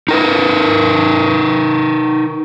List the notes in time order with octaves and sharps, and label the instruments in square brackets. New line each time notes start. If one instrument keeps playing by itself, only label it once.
[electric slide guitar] D#4 A#4 B4